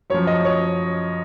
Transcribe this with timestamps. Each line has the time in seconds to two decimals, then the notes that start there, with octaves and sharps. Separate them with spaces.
0.10 F#2 F3 C#5
0.27 D#5
0.45 C#5